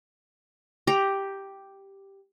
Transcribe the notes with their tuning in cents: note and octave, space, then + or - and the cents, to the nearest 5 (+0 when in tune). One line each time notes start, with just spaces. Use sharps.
G4 +0 A#5 +10